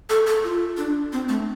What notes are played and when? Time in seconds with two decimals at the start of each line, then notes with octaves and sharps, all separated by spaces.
0.10 A4
0.27 A4
0.44 F4
0.78 D4
1.13 C4
1.29 A3